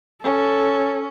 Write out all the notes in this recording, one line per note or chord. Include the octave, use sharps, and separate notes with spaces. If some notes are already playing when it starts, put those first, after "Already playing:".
C#4 A4